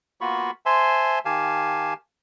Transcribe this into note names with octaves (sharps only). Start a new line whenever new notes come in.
A#3 B3 F4 F#4 B5 C#6
C5 E5 G#5 A5 C6
D#3 G4 F5 G#5 A5